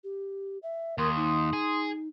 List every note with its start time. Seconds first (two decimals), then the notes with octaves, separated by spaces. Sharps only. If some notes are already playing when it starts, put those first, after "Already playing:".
0.04 G4
0.63 E5
0.98 D#2 A#4 C6 D#6
1.16 D#4
1.53 G#4